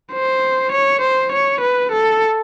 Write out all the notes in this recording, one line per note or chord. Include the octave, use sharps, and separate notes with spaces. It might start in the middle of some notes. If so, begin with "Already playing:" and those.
C5
C#5
C5
C#5
B4
A4